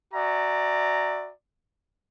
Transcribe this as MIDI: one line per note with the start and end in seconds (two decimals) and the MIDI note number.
0.14 1.31 66
0.14 1.31 74
0.14 1.31 76
0.14 1.31 80
0.14 1.31 82